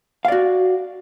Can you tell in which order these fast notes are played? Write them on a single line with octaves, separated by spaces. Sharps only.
F5 D5 F#4